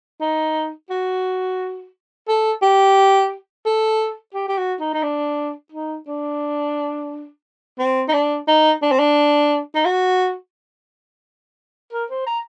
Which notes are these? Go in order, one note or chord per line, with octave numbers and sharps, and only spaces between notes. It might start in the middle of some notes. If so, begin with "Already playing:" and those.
D#4
F#4
A4
G4
A4
G4
G4
F#4
D#4
D#4
D4
D#4
D4
C4
D#4
D4
D#4
D4
C4
D4
D#4
F#4
A#4
C5
A#5